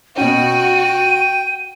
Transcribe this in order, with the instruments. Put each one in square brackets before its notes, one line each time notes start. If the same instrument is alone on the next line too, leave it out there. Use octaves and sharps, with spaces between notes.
[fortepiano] B2 C#4 [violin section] F#4 [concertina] G5 [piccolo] D#7